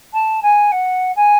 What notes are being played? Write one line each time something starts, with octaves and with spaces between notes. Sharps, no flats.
A5
G#5
F#5
G#5